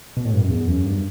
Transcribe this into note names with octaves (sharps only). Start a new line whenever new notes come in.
B2
A2
G2
F#2
E2
F#2
G2